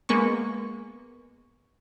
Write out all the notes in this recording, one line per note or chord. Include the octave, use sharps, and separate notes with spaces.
G#3 A#3 B3 C#6